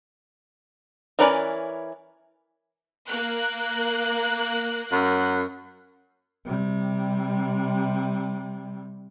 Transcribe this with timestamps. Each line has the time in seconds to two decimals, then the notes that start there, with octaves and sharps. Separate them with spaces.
1.19 E3 C#4 A#4 B4 D5
3.08 A#3 F#6
4.91 F#2
6.45 C3 G3